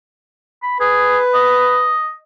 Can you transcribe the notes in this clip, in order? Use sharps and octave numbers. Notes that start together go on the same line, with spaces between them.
B5
G#4 B4
D#5